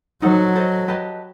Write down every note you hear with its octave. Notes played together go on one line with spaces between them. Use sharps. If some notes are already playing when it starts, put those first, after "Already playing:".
F#3 D#4 A4 C5 F#5
A4 C5 D#5
G4 B4 D#5 A5